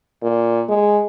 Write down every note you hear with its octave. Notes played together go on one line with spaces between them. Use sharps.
A#2
G#3